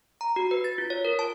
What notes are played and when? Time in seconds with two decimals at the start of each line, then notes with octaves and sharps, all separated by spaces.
0.21 A#5
0.36 F#4
0.51 B4
0.64 A6
0.78 F4
0.90 C#5
1.05 A#4
1.19 A5